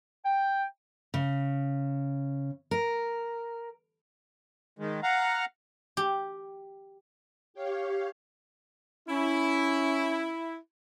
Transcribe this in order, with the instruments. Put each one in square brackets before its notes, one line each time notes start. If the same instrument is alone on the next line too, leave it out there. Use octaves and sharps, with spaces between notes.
[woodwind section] G5
[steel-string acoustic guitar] C#3
A#4
[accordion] D#3 G#3
F5 F#5 A#5
[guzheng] G4
[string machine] G4 C#5 F5
[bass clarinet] C#4 [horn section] E4